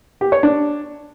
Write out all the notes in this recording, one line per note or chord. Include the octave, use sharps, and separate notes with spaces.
G4
C#5
D4